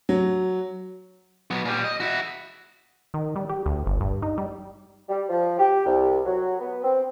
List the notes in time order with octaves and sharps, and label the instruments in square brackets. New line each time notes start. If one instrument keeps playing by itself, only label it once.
[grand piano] F#3
[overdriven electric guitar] F#3 B3
A#2 G3
D#5
E4 F#4
[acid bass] D#3
G3
G4
D2
G1
G2
D#4
G3
[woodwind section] G3
F3
G4
C2
F#3
B3
C4